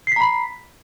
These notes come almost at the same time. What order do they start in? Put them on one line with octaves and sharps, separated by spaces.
C7 B6 A#5 B5